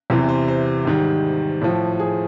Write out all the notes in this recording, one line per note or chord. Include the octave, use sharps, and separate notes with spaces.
E2 C3 E3 C5
C5
C5
G#2 D#3 G3
A2 F3
G#4